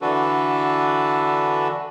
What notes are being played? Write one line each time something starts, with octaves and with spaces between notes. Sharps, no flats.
D3 E3 D4 F#4 A4 B4